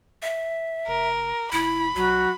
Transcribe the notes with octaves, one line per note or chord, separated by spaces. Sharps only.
E5
F1 A#4
F1 E4 B5
B1 F#3 F#4